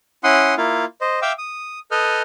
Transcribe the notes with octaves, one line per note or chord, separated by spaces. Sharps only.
C#4 E4 F#5 C6 D#6
A#3 E4 F4 F5
C5 D#5
E5 F5 G5 D6 E6
D#6
A4 B4 D#5 D#6 F6 G6